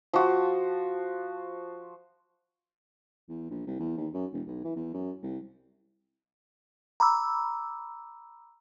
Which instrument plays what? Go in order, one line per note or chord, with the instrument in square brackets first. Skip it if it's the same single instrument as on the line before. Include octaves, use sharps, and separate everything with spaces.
[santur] F3 F#4
[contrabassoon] E2
A#1
C2
E2
D#2
F#2
E1
B1
E3
E2
F#2
C2
[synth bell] A#5 B5 D6 E6